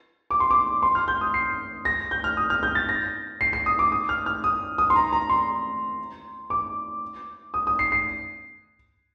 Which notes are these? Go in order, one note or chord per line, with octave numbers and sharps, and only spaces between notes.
D6
C6
D6
C6
F6
G6
D#6
C7
A#6
G6
F6
D#6
F6
G6
A6
A#6
C7
C7
D#6
D6
D#6
F6
F6
D#6
D#6
C6
A#5
A#5
C6
D6
D#6
D#6
C7
C7